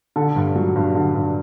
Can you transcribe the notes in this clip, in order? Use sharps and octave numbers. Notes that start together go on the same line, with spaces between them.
D3 A4
G2
F#3
G2
D3
G2